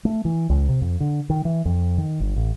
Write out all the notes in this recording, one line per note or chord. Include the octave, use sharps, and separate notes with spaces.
A3
E3
C#2
C3
F2
D3
D#3
E3
F2
D#3
G1
A1